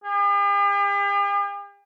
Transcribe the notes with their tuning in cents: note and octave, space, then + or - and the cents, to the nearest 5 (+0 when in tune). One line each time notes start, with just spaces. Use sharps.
G4 +45